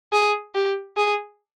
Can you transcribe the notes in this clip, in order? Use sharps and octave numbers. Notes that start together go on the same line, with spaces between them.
G#4
G4
G#4